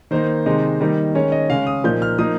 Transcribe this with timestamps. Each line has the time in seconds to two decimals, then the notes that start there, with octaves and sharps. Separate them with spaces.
0.11 D#3 A#3 D#4 C5
0.46 C3 D#3 G#3 C4 D#4
0.80 D#3 G3 A#3 D#4
1.15 D#3 G#3 C#4 C#5
1.32 D#5
1.50 C#3 G#3 C#4 F5
1.67 D#6
1.84 A#2 F3 A#3 D#4 G6
2.02 F6
2.18 F3 A#3 D#4 D#6